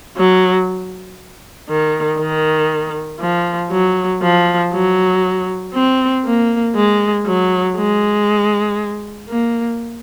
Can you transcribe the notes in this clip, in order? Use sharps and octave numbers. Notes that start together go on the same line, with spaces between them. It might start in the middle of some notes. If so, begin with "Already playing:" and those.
F#3
D#3
D#3
F3
F#3
F3
F#3
C4
A#3
G#3
F#3
G#3
A#3